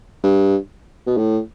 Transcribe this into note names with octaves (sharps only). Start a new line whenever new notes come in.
G2
B2
A2